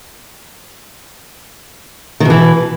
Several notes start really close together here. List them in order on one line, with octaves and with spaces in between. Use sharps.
D#3 B2 E3